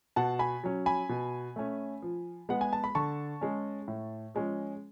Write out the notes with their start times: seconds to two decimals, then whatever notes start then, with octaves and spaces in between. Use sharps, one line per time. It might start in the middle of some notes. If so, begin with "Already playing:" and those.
0.16 B2 F#5 A5
0.39 G#5 B5
0.64 F#3 C#4
0.86 G#5 B5
1.09 B2
1.56 A3 C#4
2.02 F3
2.49 G#3 B3 F#5
2.61 G#5
2.73 A5
2.84 B5
2.95 D3 A5 C#6
3.41 G#3 C#4
3.88 A2
4.35 F3 G#3 C#4